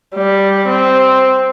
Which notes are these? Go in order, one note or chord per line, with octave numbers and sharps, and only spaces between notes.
G3
C4